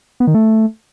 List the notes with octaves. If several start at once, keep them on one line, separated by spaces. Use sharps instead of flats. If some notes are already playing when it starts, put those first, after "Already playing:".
B3
D#3
A3